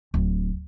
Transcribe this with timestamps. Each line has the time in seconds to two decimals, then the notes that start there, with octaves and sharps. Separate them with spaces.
0.14 D1